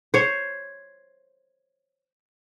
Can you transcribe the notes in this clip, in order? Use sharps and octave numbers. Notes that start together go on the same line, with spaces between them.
C5 C#5